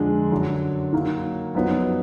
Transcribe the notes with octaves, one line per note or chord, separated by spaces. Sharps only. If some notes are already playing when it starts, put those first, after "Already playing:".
Already playing: F2 D3 G#3 D4
F#2 D3 F#3 D4
D#3 F#3 A#3
F#2 F3 B3 D#4